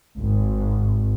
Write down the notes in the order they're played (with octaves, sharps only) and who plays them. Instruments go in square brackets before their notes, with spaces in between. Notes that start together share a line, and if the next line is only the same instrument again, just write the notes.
[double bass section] G#1